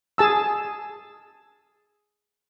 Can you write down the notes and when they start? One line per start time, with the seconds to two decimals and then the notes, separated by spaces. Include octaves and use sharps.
0.18 G#4 A5 E6